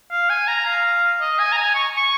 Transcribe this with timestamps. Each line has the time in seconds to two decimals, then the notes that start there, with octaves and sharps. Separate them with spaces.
0.11 F5
0.29 G#5
0.48 A#5
0.65 F5
1.20 D#5
1.39 G#5
1.52 A#5
1.57 G#5
1.75 C#6
1.96 C#6